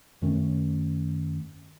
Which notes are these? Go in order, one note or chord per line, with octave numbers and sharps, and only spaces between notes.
F#2 D#3 A3 C#4